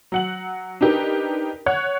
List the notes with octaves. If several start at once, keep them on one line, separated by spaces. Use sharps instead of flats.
F#3 F#5 F#7
D4 D#4 G4 A#4 B4
C#5 F#5 F#6 G#6